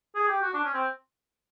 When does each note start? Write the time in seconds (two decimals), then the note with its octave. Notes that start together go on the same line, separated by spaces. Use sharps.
0.16 G#4
0.28 G4
0.42 F#4
0.54 D4
0.64 C#4
0.74 C4